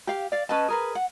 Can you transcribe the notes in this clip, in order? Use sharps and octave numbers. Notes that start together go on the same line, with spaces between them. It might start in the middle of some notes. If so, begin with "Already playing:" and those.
G4 F5
D5 F5
C#4 B4 D#5 A5
G#4 A#4 B4
F#5